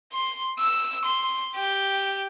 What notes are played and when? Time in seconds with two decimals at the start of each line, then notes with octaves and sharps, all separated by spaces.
0.13 C6
0.59 E6
1.05 C6
1.55 G4